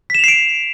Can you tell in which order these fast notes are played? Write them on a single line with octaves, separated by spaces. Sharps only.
B6 E7 F7 C7 D7